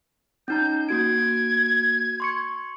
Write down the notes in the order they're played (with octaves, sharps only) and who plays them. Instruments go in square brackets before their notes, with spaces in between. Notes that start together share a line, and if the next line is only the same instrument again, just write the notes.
[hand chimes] C#4 D#4 A#5 [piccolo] G6
[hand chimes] A#3 F#4 D7 [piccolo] G#6
[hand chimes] C6 C#6 C#7